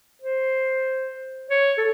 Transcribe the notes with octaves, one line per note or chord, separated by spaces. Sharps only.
C5
C#5
A4